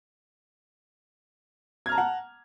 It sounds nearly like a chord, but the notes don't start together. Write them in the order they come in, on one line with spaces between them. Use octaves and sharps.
G#6 F6 A#5 A5 F#5